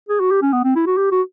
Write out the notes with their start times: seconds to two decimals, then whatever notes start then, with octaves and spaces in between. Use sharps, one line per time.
0.09 G#4
0.20 F#4
0.31 G4
0.42 C#4
0.52 B3
0.64 C4
0.75 E4
0.86 F#4
0.97 G4
1.11 F#4